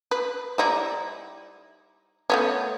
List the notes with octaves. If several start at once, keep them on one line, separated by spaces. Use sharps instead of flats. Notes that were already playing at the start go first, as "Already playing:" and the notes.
B4
G3 D#4 E4
A3 B3 C#4